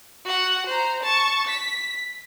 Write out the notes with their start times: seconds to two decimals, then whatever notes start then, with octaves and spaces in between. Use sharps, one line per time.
0.25 F#4 F#5
0.66 C5 A#5
1.03 A5 C#6
1.47 B6